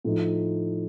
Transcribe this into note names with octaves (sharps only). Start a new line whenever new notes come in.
A2 F3 A3 D#4